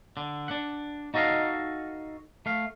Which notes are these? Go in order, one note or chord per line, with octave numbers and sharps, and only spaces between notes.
D3
D4 F#5
D#4 F#4 A4 D#5 F5
A3 F5